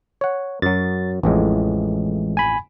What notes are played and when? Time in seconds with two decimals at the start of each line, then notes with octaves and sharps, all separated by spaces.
0.21 C#5 F#5
0.62 F#2 F#3 A6
1.23 A1 F2 A2 E3 G#3
2.37 G#5 B5